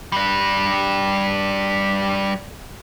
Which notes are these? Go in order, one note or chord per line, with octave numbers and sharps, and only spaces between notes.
G3 D4